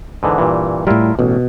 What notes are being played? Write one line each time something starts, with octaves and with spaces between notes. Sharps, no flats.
G#2 D3 E3
G2 A#2 E3
A2 G3 E4 F4 A#4
A1 B2